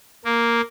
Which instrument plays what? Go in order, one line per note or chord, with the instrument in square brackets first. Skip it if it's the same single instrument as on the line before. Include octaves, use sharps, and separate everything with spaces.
[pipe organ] A#3